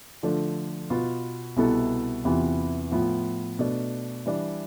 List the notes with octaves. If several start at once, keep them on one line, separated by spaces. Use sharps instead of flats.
D3 F3 A3 D4
B2 B3 F4
C2 B2 B3 E4 A4
E2 C3 E3 B3 F4
A2 F3 B3 F4
B2 A3 D4
E3 G3 D4